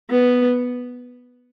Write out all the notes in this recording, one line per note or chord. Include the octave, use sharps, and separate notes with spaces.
B3